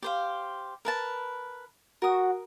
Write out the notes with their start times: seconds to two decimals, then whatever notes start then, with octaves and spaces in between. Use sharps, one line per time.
0.02 G4 C5 F5
0.85 A#4 B4 A5
2.02 F#4 A#4 D#6